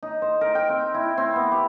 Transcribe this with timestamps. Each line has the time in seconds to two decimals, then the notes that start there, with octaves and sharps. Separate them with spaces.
0.03 D#4
0.22 C5
0.41 A#4
0.55 G5
0.69 C4
0.94 E4
1.18 C4
1.36 B3
1.52 G4